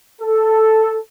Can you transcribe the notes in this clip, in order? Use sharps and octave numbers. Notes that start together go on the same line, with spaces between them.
A4